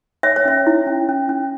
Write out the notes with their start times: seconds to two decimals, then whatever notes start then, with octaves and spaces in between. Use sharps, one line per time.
0.23 C#5 E5
0.36 C#5
0.45 C#4 E5
0.67 E4
0.87 C#4
1.09 C#4
1.29 C#4